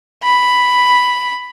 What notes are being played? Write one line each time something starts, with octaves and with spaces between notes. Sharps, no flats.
B5